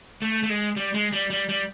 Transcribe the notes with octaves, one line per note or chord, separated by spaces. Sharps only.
A3
A3
G#3
G3
G#3
G3
G3
G3